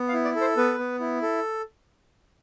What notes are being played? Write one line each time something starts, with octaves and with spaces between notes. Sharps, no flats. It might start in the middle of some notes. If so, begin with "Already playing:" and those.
Already playing: B3
F5
E4
D5
A4
C5
B3 B4
B3
E4
A4